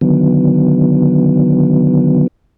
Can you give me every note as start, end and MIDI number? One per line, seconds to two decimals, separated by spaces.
0.01 2.27 50
0.01 2.27 51
0.01 2.27 54
0.01 2.27 59